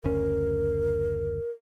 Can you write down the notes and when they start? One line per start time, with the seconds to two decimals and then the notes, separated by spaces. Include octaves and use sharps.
0.04 F#1 D2 C#4 A#4